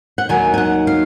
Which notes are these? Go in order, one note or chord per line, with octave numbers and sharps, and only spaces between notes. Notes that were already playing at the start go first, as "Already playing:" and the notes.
F#5
D#2 D#3 F#3 G#5
G#5
F#5
F5